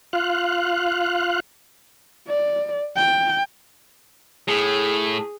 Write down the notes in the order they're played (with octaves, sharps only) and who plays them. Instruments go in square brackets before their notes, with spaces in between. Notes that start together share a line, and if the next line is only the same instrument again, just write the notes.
[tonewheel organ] F4 F5 F#6
[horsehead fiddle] D5
G5
[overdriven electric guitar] A2 [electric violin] G#4